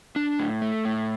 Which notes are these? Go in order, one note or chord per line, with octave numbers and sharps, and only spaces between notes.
D4
A2
A3
A2